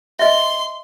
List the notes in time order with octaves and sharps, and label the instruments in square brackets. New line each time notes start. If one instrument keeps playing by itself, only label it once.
[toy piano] D#5 E5 [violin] C6